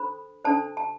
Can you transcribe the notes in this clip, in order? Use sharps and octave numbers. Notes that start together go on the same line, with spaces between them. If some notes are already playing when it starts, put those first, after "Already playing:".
Already playing: D4 A4 C5 B5
D4 A4 C5 A5
A5